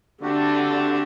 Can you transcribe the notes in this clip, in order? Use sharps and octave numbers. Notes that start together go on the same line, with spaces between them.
D3 A3 C4 D4 F#4 G4